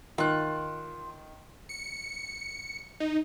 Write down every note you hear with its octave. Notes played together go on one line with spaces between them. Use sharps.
D#3 F4 F#6
C#7
D#4